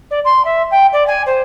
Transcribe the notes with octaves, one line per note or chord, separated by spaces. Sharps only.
D5
C6
E5
G5
D5
G#5
C5